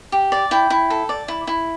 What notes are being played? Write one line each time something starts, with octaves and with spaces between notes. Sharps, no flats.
G4
D5
E4 G5
E4
A4
D5
E4
E4